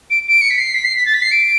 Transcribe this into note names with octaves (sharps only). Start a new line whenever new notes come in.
D7
D7
C#7
B6
C7
B6
C7
B6
A6
B6
C7
D7